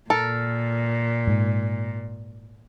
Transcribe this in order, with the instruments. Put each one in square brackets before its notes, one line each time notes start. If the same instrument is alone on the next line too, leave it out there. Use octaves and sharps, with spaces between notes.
[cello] A#2 [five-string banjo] A4 A#4
[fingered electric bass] G#2